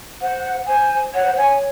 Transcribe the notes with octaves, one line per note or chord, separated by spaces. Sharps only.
C5 F#5
C5 G#5
C#5 F#5
C5
C#5 G#5